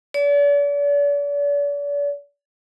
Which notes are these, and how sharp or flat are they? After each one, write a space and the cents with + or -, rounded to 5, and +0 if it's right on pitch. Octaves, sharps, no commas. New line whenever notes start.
D5 -40